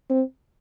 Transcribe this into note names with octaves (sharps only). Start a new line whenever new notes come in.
C4